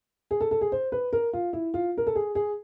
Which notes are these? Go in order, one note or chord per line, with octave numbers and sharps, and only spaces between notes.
G#4
A4
A4
G#4
C5
B4
A#4
F4
E4
F4
A#4
A4
G#4
G#4